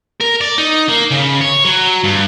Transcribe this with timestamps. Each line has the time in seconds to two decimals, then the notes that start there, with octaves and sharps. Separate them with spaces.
0.20 A#4
0.41 D5
0.58 D#4
0.88 A#3
1.11 C#3
1.41 C#5
1.65 F#3
2.04 G2